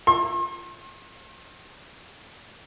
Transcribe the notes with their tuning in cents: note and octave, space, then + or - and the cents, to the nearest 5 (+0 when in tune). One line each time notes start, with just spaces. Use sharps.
C6 +40